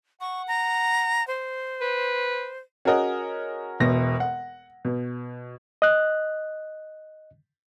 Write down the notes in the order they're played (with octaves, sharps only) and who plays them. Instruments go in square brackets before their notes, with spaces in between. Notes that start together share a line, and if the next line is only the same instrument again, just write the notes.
[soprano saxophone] F#5 [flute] C#6
[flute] A#5
C5
[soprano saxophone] B4
[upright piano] C#4 F#4 G#4 A#4 D#5 F#5
E1 B2 A#6
F#5
B2
[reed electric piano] D#5 F#6